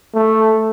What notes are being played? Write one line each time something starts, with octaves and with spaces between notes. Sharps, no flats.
A3